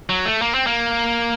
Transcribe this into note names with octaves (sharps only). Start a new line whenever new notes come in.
F#3
A3
A#3
C4
A#3